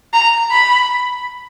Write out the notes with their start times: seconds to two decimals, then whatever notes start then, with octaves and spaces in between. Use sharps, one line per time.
0.13 A#5
0.51 B5